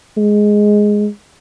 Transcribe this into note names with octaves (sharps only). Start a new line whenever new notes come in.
G#3